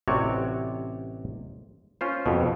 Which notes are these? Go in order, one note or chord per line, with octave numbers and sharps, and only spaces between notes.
A1 C3 F#4 C#5 D5
C#4 F4 C5
F2 B2